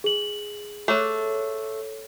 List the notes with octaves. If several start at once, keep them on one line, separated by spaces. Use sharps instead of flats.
G#4 F#7
A3 A4 C#5